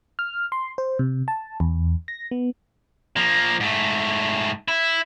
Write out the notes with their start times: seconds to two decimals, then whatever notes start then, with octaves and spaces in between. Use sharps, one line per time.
0.19 F6
0.52 C6
0.78 C5
0.99 C3
1.28 A5
1.60 E2
2.08 A#6
2.31 B3
3.16 F3 A#3
3.60 G#2 A3
4.68 E4